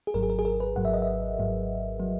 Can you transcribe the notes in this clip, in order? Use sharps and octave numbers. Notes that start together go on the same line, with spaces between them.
G#4
G#1 G#2 F#3 A#4
G#4
A#4
G#4
A#4
B4
G#1 G#2 F#3 F#5
E5
D#5
E5
G#1 G#2 F#3
F#3